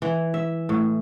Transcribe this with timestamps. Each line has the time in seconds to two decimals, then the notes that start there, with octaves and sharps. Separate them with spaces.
0.02 E3
0.34 E5
0.69 A2